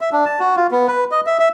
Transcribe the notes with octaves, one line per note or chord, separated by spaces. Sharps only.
E5
D4
A5
F#4
F4
B3
B4
D#5
E5
E5